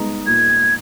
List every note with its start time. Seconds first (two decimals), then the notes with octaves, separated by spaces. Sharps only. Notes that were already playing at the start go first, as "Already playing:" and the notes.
Already playing: G#3 B3 D#4
0.27 A#2 G#6